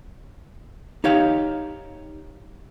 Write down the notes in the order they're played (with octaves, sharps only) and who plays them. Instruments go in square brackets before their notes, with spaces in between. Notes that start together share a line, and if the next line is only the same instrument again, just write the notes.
[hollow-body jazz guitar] D#4 G4 C#5 F5